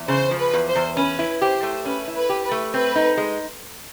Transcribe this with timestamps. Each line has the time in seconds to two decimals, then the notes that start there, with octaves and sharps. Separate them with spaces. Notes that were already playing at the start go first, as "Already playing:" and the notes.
Already playing: E2
0.08 C#3 C5
0.31 F3
0.39 B4
0.54 E2
0.68 C5
0.75 E2
0.97 C#4 B4
1.19 E4
1.41 G4 C5
1.63 A3
1.85 C#4 B4
2.08 E4
2.15 B4
2.29 G4
2.45 B4
2.51 A3
2.74 C4 B4
2.96 D#4
3.17 G#3